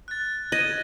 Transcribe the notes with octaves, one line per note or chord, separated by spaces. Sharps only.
F#6 A6
D#5 G#6 A#6